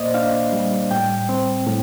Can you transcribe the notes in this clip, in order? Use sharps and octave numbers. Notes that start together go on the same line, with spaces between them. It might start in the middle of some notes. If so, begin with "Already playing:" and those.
Already playing: A#2 A#3 C5 D5 D#5
D4 F5
G3
A2 G5
C4
A2